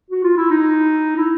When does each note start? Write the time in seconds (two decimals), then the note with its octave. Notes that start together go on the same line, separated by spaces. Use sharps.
0.10 F#4
0.24 F4
0.37 E4
0.50 D#4
1.17 E4